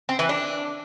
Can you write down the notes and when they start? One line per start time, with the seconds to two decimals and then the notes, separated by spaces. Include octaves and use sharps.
0.09 C4
0.19 E3
0.29 D4